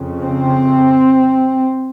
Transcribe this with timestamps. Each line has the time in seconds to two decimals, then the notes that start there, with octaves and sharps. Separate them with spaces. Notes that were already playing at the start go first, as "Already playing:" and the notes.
Already playing: F2 C#3
0.21 C4